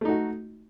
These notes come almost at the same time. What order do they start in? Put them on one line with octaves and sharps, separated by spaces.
A3 D#4 F#4